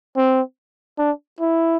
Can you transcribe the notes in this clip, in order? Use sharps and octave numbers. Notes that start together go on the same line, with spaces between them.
C4
D4
E4